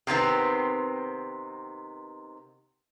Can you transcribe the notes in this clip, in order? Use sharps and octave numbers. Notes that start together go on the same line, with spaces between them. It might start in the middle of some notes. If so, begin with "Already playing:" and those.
C3 D#3 B3 C4